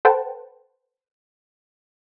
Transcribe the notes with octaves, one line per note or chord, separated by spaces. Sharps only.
A4 B4 C5 F#5 G5 A5